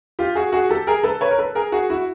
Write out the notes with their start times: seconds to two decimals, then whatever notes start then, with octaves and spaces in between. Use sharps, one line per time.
0.19 F4 G4
0.35 F#4 G#4
0.52 F#4 G#4
0.69 G4 A4
0.87 G#4 A#4
1.03 A4 B4
1.21 B4 C#5
1.31 A#4
1.39 A4 B4
1.55 G#4 A#4
1.72 F#4 G#4
1.90 E4 F#4